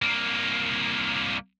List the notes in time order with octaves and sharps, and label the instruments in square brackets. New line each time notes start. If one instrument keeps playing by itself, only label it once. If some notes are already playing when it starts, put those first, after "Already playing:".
[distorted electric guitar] C2 A#3